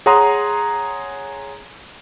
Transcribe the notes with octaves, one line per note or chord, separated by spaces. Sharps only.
G#4 C#5 F#5 A#5 C6 D#6